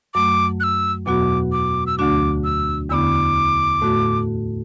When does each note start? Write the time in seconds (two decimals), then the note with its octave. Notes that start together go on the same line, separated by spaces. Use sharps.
0.14 F#2 F#3 A3 D6
0.60 F#6
0.64 E6
1.06 E2 B2 F#3 B3 F#4 D6
1.52 D6
1.87 E6
1.98 D2 D3 A3 D4 F#4 D6
2.44 E6
2.90 E2 D3 B3 E4 D6 E6
3.81 A2 A3 F#4